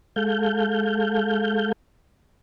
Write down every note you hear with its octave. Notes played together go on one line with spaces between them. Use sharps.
G#3 A4 F5 G6